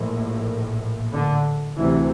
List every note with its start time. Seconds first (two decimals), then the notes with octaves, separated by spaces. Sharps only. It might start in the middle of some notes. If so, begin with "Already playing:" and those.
Already playing: A#1 A2
1.13 D3
1.76 D2 C3 E3